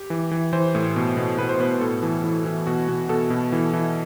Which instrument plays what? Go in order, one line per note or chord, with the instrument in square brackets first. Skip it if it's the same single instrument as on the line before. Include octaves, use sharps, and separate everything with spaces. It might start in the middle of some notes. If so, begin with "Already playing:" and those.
Already playing: [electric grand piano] G4
E3
E3
E3 C5
A2
B2
B2
B2 B4
C5
B2 B4
A2 A4
E3
E3
E3
B2 F#4
B2
B2 A4
B2
E3
E3